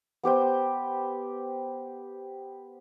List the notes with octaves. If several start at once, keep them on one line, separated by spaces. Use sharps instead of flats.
B3 G4 C5 G5